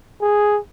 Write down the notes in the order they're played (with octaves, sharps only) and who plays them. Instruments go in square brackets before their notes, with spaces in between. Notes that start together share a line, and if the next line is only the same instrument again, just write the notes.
[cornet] G#4